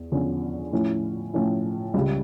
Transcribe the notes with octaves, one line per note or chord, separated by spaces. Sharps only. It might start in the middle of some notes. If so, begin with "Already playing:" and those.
Already playing: E2
E2 D3 F3 C#4
A2 F3 C#4 E4
A2 F3 C#4 E4
C#2 C#3 G3